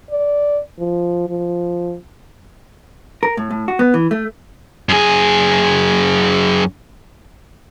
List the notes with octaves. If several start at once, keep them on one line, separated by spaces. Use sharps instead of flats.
D5
F3
F3
A#4
A2
A2
F#4
B3
E3
A3
F#2 G#4